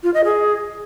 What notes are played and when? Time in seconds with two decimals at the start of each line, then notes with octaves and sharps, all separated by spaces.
0.03 F4
0.14 D#5
0.25 G#4